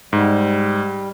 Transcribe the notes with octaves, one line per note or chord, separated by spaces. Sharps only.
G#2 G3